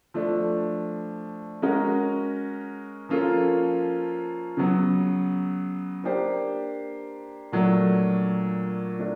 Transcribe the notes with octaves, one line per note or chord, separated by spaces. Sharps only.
F3 A3 D4
G#3 C#4 F#4 A#4
F3 A#3 C#4 F4 A4
C#3 F#3 B3
A#3 D4 G4 C5
A#2 F#3 A3 D4
A3 D4